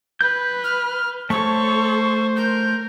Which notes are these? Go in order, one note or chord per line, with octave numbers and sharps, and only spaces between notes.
B4 G6
F6
A3 A4 C5 C#5 C#6
A#4 G6